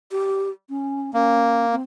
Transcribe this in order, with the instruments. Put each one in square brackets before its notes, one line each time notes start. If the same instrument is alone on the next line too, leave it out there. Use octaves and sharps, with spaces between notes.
[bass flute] G4
C#4
[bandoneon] A#3 [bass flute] C#4
[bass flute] C4